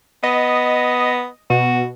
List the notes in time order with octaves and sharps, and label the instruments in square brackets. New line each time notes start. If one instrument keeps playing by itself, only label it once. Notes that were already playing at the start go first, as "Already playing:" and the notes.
[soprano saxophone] B3 [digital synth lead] D#5
[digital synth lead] B2 [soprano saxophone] F#4